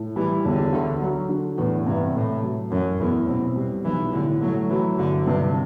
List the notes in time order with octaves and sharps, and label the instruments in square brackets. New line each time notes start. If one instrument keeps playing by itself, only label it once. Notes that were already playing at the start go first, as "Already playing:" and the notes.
Already playing: [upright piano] A2
[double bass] E3 [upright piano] G3
[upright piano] E1 [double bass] D3
[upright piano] D2
F#3
D3
[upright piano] E2 [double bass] A2
[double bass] G2 [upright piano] C3
[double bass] A2 [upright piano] A3
[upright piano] F#3
[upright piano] A1 [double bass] F#2
[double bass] E2 [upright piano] A2
[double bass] B2 [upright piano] C4
[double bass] B2 [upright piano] G3
[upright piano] B1 [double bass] E3
[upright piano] A2 [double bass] D3
[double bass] F#3 [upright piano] A3
[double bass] E3 [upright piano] F#3
[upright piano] G1 [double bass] D3
[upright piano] G2 [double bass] C3